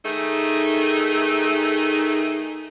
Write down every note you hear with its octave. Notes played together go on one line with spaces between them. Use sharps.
D#3 A3 D#4 G#4